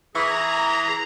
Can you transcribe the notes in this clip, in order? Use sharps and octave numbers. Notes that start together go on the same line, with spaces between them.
E3 G#4 B4 E5 A#5 C#6